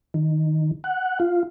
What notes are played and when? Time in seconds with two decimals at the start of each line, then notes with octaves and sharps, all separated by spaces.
0.14 D#3
0.84 F#5
1.20 F4